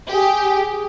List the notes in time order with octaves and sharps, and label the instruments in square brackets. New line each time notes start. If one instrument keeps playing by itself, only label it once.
[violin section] G4 [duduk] G#4